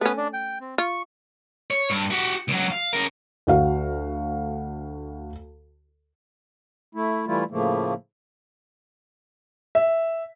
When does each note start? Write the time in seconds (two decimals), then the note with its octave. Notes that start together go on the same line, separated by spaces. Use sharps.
0.01 A3 B3 C#4 B4
0.18 D4 D5
0.33 G5
0.61 C4
0.78 F4 C#6
1.70 C#5
1.89 G2
2.10 F#4 G4
2.48 C#2 F#3
2.70 F5
2.93 C#3 A#4
3.47 D2 F#4 F5
6.95 A3 E4
7.27 E3 G3 A3 E4 F4
7.51 A2 C#3 F3 A3 A#3
9.75 E5